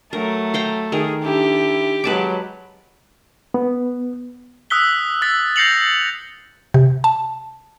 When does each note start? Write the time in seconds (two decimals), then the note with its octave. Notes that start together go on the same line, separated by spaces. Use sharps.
0.13 F#3 A3 A#4
0.54 F5 G5 A#5
0.92 D#3 G#4 A#4
1.23 D4 E4 G4
2.04 F#3 G#3 B4 A5 D6
3.54 B3
4.70 D#6 E6 F#6 B6 G7
5.22 E6 A6 B6
5.56 G6 A#6 C7 C#7 F7 F#7
6.74 C3
7.04 A5